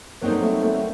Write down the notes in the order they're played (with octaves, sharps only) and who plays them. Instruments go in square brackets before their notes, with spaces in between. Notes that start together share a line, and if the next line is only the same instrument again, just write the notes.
[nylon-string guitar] F#3 C4 D#4 A4 C5 [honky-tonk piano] A#3
[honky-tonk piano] G3
A3
A3